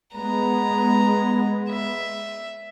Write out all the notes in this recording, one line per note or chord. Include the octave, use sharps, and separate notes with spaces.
G#3 B3 A#5
E5